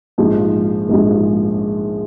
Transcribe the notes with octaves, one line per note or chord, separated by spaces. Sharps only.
A#1 G#2 F3 G#3
A#1 G#2 F3 G#3